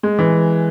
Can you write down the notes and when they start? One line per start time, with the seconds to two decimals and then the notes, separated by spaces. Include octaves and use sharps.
0.03 G#3
0.19 E3